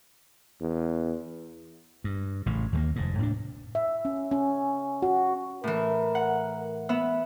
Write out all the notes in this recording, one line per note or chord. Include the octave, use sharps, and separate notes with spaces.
E2
G2
A1 A2 C#3
D#2 G3 A#3
F1 G#2
A2 C#4 D4
E5
C#4
C#4
F#4
A2 E3 A#4
F#5
B3 B4 E5